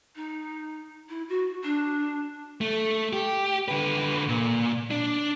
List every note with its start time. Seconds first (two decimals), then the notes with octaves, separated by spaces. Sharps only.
0.15 D#4
1.09 E4
1.29 F#4
1.63 D4
2.61 A3
3.13 G4
3.68 D3 B4
4.29 A#2
4.91 D4